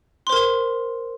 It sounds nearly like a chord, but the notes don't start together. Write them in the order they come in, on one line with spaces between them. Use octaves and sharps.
C6 C5 A#4